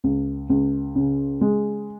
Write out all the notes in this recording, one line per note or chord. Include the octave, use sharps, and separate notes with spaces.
C#2
C#2
C#3
G#3